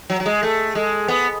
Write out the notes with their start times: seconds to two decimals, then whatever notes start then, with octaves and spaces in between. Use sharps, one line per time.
0.10 F#3
0.20 F#3
0.26 G#3
0.43 A3
0.75 G#3
1.08 B3